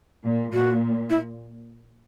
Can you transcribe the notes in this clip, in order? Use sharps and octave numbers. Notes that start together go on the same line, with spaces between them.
A#2
A#2 F#4
E4